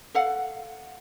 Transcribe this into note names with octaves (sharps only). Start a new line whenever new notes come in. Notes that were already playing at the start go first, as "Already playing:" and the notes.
A4 F5 F#5